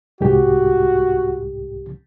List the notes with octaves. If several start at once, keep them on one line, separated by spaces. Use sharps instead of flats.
C2 G#2 F#4 G4